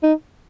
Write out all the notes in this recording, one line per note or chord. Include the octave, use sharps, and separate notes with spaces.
D#4